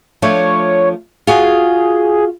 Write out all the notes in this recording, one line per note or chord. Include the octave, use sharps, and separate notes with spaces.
F3 A3 D4 C#5
F4 F#4 G#4 G#5